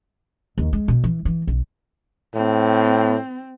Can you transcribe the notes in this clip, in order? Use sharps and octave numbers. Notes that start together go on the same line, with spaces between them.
D#2
G#3
B2
E3
E3
B1
A2 C4